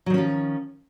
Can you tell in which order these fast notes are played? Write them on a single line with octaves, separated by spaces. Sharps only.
F#3 D#3 C#4 F3